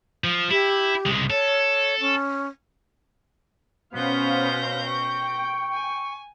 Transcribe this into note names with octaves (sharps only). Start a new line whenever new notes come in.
F3
E4 G4
C2 G#3
A4 C#5
C#4
B2 B3 C#4 C5 F5 G6 A#6
G5 C#6
G#5